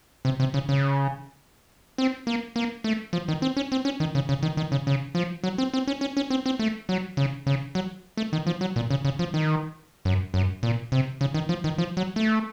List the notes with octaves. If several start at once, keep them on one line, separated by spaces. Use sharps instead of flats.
C3
C3
C#3
C#3
C4
A#3
A#3
A3
F3
D#3
C4
C#4
C4
C#4
D#3
C#3
C#3
D#3
D#3
C#3
C#3
F3
F#3
C4
C4
C#4
C#4
C#4
C4
C4
A3
F#3
C#3
C#3
F#3
A3
D#3
F3
F#3
A#2
C#3
C#3
F3
D#3
F#2
F#2
A#2
C3
C#3
D#3
F3
D#3
F3
F#3
A3